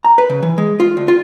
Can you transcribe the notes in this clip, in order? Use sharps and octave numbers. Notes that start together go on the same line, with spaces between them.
A#5
B4
C#3
E3
G#3
F4
D2
F4